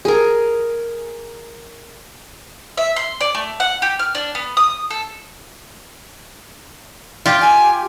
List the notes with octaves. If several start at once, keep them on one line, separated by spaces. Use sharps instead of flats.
G#4 A#4
E5
C6
D5
A3
F#5
G4
F6
D4
B3
D#6
A4
F4 G4
G#5